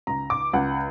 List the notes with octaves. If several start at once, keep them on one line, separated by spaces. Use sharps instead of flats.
C#2 A#5
D6
C#2 F#5